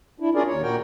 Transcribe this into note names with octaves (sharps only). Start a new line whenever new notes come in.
D4 E4
C#4 D4 F4 G#4 A#4 D5
D#2 C#5
A#2 F#4 A#4 G5